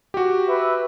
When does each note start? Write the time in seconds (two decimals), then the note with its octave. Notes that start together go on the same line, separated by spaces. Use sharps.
0.14 F#4 G4
0.48 B4 E5